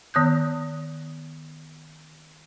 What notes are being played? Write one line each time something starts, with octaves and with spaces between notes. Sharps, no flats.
D#3 B3 C#5 D#6 F#6 G6